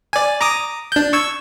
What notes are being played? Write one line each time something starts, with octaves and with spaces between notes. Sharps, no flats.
D5 G#5
A#5 D6 D#6
D4 G6
C#6 E6 G#6